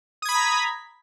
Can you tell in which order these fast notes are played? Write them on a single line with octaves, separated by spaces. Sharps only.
D#6 G#6 B5 B6 A#5